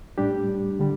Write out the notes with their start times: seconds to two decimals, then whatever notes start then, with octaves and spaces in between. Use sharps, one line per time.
0.18 A2 G3 D4 G4
0.79 D3 G3